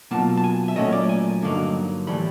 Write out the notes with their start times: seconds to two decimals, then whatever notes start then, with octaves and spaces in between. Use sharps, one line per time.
0.11 B2 F#3 A#3 F4 A5
0.37 A5
0.44 G#5
0.68 E5
0.76 A#2 F#3 A3 C#4 D#5
0.93 D5
1.09 G#5
1.42 G2 D3 F#3 A#3 D#4
2.07 A2 E3 G3 B5